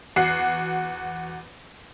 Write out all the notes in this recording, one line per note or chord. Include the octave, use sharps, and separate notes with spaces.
E2 F#4 C7